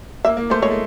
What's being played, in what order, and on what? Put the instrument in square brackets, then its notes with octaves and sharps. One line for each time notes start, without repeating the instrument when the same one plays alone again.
[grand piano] A#3 [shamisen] E5
[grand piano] A#3
[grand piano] A3 [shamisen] C5
[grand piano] G#3 [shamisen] C#5
[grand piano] A3